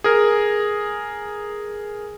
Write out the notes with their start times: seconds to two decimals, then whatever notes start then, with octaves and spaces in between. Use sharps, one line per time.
0.04 G#4 A#4